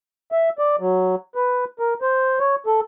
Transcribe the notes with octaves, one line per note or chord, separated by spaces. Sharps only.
E5
D5
F#3
B4
A#4
C5
C#5
A4